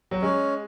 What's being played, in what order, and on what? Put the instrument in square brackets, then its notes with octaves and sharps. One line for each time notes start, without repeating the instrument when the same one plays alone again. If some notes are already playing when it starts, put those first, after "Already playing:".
[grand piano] F#3
[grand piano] G#3 [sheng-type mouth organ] C#4